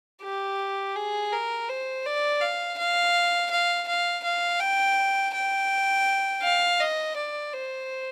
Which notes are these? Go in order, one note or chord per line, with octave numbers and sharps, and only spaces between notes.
G4
G#4
A#4
C5
D5
F5
F5
F5
F5
F5
G5
G5
F5
D#5
D5
C5